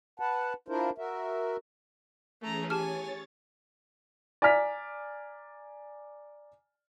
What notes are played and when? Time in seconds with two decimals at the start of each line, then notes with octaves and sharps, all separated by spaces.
0.20 B4 F#5 A5
0.68 D4 E4 F4 A#4 C5
0.98 F#4 A#4 E5
2.42 E3 A3 C#4 G#4 A#5
2.70 G4 C#5 G#5 A5 F6 A6
4.42 D5 G#5 A#5 F6 B6